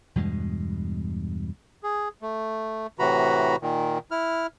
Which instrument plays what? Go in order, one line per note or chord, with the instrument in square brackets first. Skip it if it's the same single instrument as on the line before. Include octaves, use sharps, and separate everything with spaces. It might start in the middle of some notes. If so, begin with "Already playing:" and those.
[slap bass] E2 G2 B2 G#3
[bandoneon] G#4
A3
A2 C3 E3 F#4 A#5 B5
A#2 D#3
E4 F6